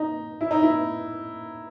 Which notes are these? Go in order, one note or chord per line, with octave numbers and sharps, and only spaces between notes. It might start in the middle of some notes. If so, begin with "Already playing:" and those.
Already playing: D#4
E4
D#4
E4